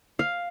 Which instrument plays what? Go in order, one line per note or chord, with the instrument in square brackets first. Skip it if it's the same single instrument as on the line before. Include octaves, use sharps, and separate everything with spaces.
[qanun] F5